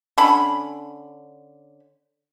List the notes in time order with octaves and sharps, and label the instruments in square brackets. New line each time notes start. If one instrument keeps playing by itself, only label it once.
[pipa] D3 C#4 B5